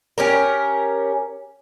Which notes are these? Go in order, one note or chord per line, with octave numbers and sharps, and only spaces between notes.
C#4 G4 A#4